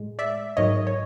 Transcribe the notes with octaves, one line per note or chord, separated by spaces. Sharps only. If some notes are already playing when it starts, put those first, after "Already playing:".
Already playing: A2 G#3
D5 E5
G#2 D#3 F#3 C#5 D#5
C#5